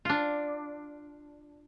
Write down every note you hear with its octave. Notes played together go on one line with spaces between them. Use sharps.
D4 F4